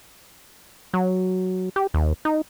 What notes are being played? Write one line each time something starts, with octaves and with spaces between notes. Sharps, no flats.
F#3
G4
D#2
D#4